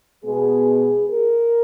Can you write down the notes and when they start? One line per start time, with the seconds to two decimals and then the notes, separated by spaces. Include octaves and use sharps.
0.24 B2 G#3 B3 G#4
1.08 A#4